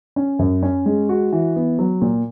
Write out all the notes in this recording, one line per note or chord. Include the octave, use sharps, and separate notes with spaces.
C#4
F#2
C#4
G#3
F#4
E3
B3
F#3
A#2